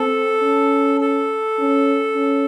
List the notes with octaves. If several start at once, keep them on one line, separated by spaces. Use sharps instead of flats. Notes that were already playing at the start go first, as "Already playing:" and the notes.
Already playing: C4 A4
C#4
A4
C#4
C#4